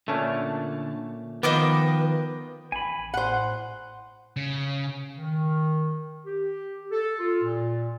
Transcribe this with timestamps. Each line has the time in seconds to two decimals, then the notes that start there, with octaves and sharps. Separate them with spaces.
0.08 A#2 D3 A3 C#4 D5 A5
1.43 D#3 F3 B3 B4 D#5 G5 D6
2.72 A1 G#5 B5
3.14 A2 C5 F#5
4.36 C#3
5.17 D#3
6.26 G4
6.92 A4
7.20 F4
7.43 A#2